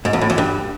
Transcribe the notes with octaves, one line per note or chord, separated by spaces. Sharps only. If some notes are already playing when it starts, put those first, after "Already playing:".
G#2
E2
A2
E2
G2